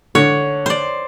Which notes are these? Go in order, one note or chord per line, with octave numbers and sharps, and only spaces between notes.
D3 C#5
C5 D5